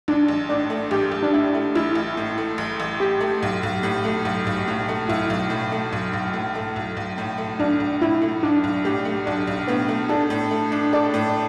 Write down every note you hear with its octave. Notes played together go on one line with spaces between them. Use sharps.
A1 D4
A1
A2 D4
A3
A1 G4
A1
D4
A2 E4
A3
A1 E4
A1
A2
A3
A1
A1
A2 G4
A3
B1
B1
A2
A3
B1
B1
A2
A3
B1 E4
B1
A2
A3
B1
B1
A2
A3
B1
B1
A2
A3
B1 D4
B1
A2 E4
A3
B1 D4
B1
A2 G4
A3
B1 D4
B1
A2 B3
A3
D4 A4
A2
A3
D4
A4 D5
A2